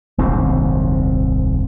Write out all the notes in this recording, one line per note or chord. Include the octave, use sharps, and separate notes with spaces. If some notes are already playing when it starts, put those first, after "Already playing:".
D#1 C2 G#2 C4